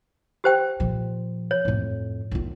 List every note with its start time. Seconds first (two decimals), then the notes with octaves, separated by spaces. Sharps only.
0.44 G4 C5 G5
0.80 A#2 F3
1.51 C#5
1.65 F2 A2
2.32 D#3 F4